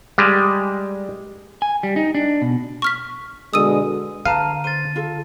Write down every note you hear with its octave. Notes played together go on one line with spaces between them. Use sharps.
G3 G#3
G#5
G3
D#4
D4
B2
C#6 F6 B6
B2 D3 G#3 D#6 E6 D#7
D3 B4 F5 A5 A#5 D#7
C5 A6 D#7
F4 A4